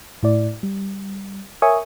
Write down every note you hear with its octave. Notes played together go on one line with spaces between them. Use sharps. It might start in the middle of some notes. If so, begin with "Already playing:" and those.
A2 E4 D5
G3
A#4 C#5 E5 G#5 C#6 D#6